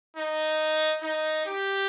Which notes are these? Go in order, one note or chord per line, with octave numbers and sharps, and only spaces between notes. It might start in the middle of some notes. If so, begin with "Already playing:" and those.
D#4
D#4
G4